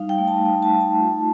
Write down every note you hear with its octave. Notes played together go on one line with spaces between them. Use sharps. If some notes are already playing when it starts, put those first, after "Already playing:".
Already playing: G3 D#4 F5
G5
A3
A5
D#4 A5
A5
A3
A5
F4